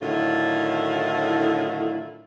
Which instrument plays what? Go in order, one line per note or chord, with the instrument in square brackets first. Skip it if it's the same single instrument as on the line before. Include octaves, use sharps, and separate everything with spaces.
[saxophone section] A2 D3 D#3 F#3 E4 F4